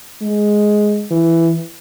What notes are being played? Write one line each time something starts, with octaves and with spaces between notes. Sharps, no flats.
G#3
E3